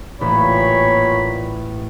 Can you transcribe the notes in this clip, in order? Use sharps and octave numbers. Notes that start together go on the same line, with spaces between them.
A1 A#2 C#5 B5